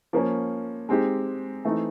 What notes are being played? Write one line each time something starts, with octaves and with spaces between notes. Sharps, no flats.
F3 A#3 C#4
G#3 C4 D#4 G4
E3 A3 C4 D#4